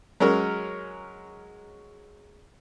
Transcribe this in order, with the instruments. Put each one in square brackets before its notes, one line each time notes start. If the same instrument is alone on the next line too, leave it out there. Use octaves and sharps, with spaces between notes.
[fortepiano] F#3 G#3 C#4 A#4 C#5